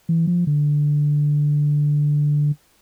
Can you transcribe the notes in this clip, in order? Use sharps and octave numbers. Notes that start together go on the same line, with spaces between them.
E3
F3
D3